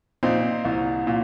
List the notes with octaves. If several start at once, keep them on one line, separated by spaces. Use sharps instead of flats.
A#2 C4 D#4
C2
A#2